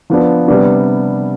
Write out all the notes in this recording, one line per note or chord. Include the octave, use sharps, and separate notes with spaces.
F3 B3 D4
C3 G3 B3 D4